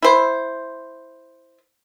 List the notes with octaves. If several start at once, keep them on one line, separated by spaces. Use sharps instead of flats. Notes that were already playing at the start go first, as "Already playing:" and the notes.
E4 C5